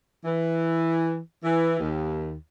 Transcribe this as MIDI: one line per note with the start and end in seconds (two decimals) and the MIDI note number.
0.25 1.18 52
1.43 1.78 52
1.80 2.32 39